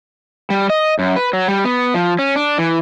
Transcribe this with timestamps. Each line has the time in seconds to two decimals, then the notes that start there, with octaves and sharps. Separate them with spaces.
0.50 G3
0.70 D#5
0.99 F#2
1.16 B4
1.33 F#3
1.48 G3
1.65 B3
1.94 F3
2.19 C#4
2.36 D4
2.58 E3